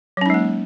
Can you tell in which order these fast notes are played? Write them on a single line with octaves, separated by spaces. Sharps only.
F#3 C#4 D#4 G#3 A#3